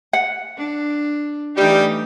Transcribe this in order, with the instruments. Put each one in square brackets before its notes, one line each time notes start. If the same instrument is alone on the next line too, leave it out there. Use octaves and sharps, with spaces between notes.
[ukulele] F#5
[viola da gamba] D4
[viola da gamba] E3 A3 D#4 [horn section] G3 G4